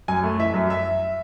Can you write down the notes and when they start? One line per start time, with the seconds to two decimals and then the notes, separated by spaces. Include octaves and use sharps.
0.08 F#2 G#5
0.23 A3
0.39 E3 E5
0.54 F#2
0.70 E5